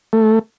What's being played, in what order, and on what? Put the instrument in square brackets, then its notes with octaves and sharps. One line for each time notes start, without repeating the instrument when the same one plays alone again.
[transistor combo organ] A3